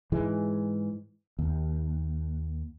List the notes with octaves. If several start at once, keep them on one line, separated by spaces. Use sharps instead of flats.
G#2 E3 G#3
D#2